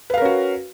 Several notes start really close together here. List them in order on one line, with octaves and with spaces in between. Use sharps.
B4 F5 A#4 C#4 F#4